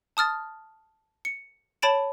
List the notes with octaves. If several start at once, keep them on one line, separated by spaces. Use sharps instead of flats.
A5 D#6 F6 A6
C#7
C#5 A5 B5 A6 D7 E7